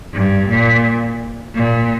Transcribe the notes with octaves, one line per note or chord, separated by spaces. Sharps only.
G2
A#2
A#2